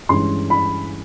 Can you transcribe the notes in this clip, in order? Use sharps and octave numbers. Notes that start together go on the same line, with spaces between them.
G2 E3 G#3 C#4 C6
B5